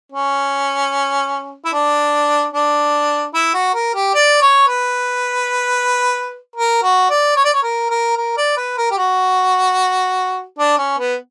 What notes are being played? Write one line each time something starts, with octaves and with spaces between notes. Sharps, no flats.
C#4
E4
D4
D4
E4
F#4
A#4
G4
D5
C#5
B4
A#4
F#4
D5
C#5
D5
C#5
A#4
A#4
A#4
D5
B4
A#4
G4
F#4
D4
C#4
B3